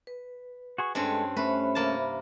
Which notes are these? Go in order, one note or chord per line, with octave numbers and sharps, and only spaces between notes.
B4
F#4 G#4 C#6
G2 G#3 C4 C#4 A4
A3 C#4 B4 C5 E5 B5
C3 A#3 A5